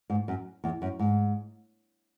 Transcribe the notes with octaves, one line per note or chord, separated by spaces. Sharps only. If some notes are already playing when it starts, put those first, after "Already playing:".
G#2
F#2
E2
F#2
G#2